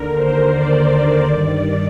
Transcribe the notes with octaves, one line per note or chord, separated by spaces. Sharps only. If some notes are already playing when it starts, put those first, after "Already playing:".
Already playing: D#2 D3 A#4
C5
D5
G2 D#3 D5